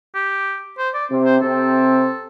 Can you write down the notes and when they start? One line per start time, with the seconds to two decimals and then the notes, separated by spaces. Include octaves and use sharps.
0.15 G4
0.78 C5
0.94 D5
1.10 C3 C4
1.25 C5
1.42 C3 C4 A4